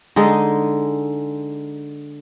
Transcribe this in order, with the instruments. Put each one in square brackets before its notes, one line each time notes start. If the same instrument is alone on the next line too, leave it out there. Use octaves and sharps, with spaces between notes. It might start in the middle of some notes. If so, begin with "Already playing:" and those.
[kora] D3 G#3 D#4